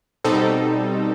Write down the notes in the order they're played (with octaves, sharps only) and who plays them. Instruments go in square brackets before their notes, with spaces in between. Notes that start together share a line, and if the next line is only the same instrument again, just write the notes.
[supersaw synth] B2 G3 C4 D#4 A4